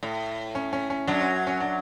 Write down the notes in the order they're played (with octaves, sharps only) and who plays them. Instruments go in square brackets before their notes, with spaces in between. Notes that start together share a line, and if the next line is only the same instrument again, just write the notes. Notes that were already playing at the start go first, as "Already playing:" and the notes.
[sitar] A2
[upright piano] C#4
C#4
C#4
[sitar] F#2 F#3 [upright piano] D4
[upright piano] C#4
C#4
D4